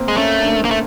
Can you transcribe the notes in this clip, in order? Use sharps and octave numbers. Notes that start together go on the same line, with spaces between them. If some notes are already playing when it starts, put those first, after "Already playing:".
Already playing: A#3 C4
G#3
A3 C#4
D4
A#3
A3